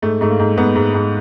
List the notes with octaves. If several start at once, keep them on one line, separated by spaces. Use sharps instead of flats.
G#2 A3
G#2 A3
A#3
G#2
G#2 B3
G#2
G#2